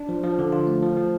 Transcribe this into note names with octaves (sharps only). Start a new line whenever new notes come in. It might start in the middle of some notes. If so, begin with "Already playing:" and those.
Already playing: D4
F3
F3
D3
F4
A3
F3
F3